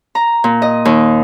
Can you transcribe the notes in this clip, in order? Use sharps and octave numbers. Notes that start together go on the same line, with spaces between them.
A#5
A#2
D#5
D#2